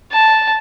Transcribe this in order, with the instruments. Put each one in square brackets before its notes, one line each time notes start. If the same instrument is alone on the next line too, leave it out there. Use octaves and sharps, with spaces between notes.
[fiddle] A5